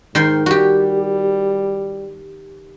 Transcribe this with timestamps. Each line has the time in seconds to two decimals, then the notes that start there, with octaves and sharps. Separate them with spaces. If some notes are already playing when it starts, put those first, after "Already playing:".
0.15 G#2 D#3 G5 C6
0.46 G3 F#4 G4